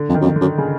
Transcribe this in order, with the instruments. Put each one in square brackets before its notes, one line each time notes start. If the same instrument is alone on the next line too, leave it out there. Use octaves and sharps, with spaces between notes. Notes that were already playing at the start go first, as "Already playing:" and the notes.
Already playing: [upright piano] D3
[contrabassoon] F2
[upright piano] D#3
[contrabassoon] F#2
F2
[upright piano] D3
[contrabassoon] F#2
[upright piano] C#3